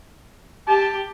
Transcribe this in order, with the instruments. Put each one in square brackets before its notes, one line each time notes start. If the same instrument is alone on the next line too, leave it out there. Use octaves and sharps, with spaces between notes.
[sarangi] G4 [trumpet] A5